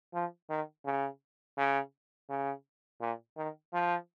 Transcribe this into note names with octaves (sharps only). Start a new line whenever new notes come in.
F3
D#3
C#3
C#3
C#3
A#2
D#3
F3